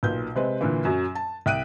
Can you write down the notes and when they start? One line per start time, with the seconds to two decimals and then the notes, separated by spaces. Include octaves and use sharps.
0.03 B1 A#2 B4 G6
0.35 C3 G#3 C4 B4
0.61 A#2 D3 E3
0.85 F#2 F#3
1.15 A5
1.46 C2 G5 F#6 D7 D#7